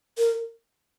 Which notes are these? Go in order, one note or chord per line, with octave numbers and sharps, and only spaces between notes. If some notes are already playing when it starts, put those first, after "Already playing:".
A#4